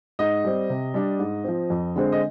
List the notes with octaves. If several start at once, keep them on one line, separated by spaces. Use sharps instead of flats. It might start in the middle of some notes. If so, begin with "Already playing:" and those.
G#2 D#5
G3 C4
C3
G3 D4
G#2
F3 C4
F2
D3 G#3 C4
D#5